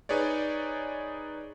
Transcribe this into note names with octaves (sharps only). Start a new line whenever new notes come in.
D#4 G#4 B4 C#5 D5